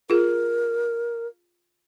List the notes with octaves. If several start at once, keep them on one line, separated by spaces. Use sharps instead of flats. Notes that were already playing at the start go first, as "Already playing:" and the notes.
F4 G#4 A#4